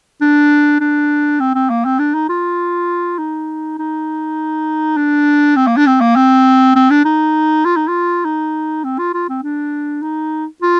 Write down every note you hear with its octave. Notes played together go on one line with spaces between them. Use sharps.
D4
D4
C4
C4
A#3
C4
D4
D#4
F4
D#4
D#4
D4
C4
A#3
D4
C4
A#3
C4
C4
D4
D#4
F4
D#4
F4
D#4
C4
F4
F4
C4
D4
D#4
F4